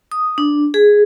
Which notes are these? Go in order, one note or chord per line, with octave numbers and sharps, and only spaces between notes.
D#6
D4
G#4